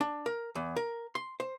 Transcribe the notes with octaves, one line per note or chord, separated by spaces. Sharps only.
D4
A#4
E2
A#4
C6
C5